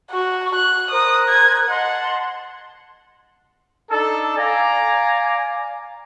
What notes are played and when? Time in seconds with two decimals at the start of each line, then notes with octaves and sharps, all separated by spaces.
0.11 F#4 C#6
0.55 F#6
0.91 A#4 C5 D#6 F#6
1.29 G#6
1.69 D#5 F#5 A5 C6
3.91 D4 D#4 A4
4.37 D5 F5 G#5 A#5